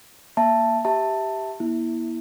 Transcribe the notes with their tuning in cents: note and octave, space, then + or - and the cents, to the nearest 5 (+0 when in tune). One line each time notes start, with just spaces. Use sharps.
A#3 +0 E5 +25 A5 +0
G4 +0 E5 -10 A5 +15
A#3 +45 E4 -15